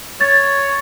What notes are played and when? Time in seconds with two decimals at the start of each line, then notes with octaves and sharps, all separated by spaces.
0.21 C#5 A6